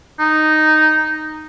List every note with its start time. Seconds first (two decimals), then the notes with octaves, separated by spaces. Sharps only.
0.20 D#4